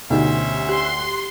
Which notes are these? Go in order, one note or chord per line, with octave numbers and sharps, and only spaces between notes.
D2 B2 C#4 D#4 G4 C5 E5
G4 C6 F#6